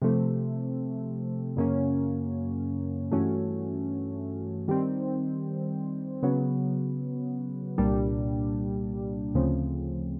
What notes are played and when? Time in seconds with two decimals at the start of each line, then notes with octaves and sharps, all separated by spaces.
0.02 C3 F3 A3 C4
1.56 F#2 C#3 F#3 A#3 C#4
3.12 G2 E3 A3 C#4 F#4
4.68 D#3 G3 C4
6.23 C#3 F#3 B3
7.78 C2 A#2 G3 A#3 D4
9.35 D2 C#3 F3 A3 C4